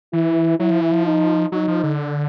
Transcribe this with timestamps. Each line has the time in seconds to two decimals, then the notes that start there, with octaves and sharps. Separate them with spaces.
0.13 E3 E4
0.60 F#3 E4
0.70 F3
0.81 E3
0.91 F3
1.05 D#4
1.52 F#3 D#4
1.68 F3
1.84 D3